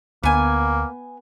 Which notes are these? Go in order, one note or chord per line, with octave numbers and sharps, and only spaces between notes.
D2 A#3 B3 G#5